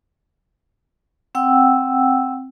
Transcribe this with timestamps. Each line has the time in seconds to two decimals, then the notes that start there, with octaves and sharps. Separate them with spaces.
1.35 C4 F#5 G5 E6